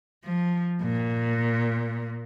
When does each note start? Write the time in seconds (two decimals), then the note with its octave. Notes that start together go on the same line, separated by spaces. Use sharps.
0.24 F3
0.82 A#2